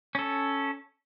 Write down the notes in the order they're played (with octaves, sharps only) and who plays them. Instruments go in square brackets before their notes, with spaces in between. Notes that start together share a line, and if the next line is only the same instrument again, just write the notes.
[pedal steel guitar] C#4 A4